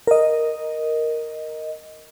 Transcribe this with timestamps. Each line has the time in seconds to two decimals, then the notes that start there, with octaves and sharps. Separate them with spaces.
0.07 A#4 D#5